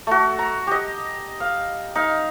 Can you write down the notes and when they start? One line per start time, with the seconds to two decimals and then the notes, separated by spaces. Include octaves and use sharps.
0.07 A3 F#4
0.39 A#5
0.67 G4 D#5
1.40 F5
1.95 D#4 F5